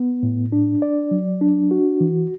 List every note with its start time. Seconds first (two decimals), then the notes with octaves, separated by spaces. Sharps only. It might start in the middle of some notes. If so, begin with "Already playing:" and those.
Already playing: B3
0.23 A2
0.52 D4
0.82 D5
1.11 F#3
1.41 D4
1.71 F#4
2.01 E3